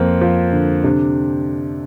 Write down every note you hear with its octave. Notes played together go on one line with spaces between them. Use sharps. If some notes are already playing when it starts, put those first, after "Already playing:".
Already playing: F2 A#3 C4
F3
D3
C3 D4